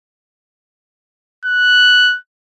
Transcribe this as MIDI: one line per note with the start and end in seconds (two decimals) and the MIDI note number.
1.46 2.18 90